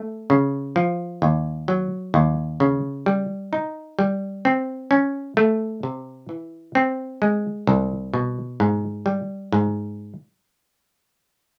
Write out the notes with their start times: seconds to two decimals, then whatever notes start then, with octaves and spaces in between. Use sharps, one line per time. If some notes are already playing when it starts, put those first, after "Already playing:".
Already playing: A3
0.30 C#3
0.76 F3
1.22 D#2
1.68 F#3
2.14 D#2
2.60 C#3
3.06 G3
3.53 D#4
3.99 G3
4.45 C4
4.91 C#4
5.37 A3
5.83 C3
6.29 E3
6.75 C4
7.22 G#3
7.67 C2
8.14 B2
8.60 G#2
9.06 G3
9.53 G#2